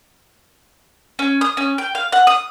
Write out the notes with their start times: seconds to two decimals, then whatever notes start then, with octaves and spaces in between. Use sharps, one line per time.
1.19 C#4
1.41 D#6
1.57 C#4
1.78 G5
1.95 F5
2.12 F#5
2.27 D#6